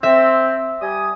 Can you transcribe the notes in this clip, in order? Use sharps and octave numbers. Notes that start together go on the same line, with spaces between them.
C4 E5
G3 G#5 D#6